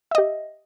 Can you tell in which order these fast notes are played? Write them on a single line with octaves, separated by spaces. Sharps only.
E5 D#5 G4